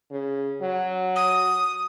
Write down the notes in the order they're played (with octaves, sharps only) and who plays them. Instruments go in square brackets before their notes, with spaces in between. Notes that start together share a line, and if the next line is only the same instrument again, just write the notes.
[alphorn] C#3
F#3
[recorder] D#6